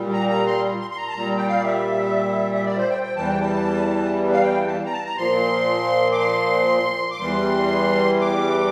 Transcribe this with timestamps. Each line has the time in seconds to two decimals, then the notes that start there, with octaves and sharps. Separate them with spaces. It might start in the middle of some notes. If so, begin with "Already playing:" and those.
Already playing: A#2 G3
0.13 A#5
0.29 A#5
0.47 C6
0.80 C6
0.91 C6
0.97 A#5
1.08 A5
1.13 A#2 G3 A#5
1.38 G5
1.48 F5
1.59 D5
1.64 E5
2.55 E5
2.66 D5
2.78 C5
2.90 G5
3.03 G5
3.16 E2 E3 G3 A5
3.28 G5
3.41 A5
4.32 F5
4.43 G5
4.67 A5
4.86 A#5
4.92 A5
5.05 A#5
5.17 A#2 F3 C6
6.12 D6
6.19 C6
7.11 D6
7.19 E2 E3 G3 C6
8.20 D6